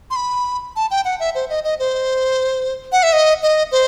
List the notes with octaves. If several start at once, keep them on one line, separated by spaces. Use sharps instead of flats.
C6
B5
A5
G5
F#5
E5
C5
D#5
D#5
C5
F#5
E5
D#5
D#5
C5